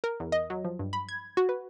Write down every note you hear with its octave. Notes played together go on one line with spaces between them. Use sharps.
A#4
E2
D#5
F#3
F3
G2
B5
G#6
F#4
B4